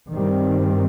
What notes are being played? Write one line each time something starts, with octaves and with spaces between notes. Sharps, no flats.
G2 D#3 G3 C4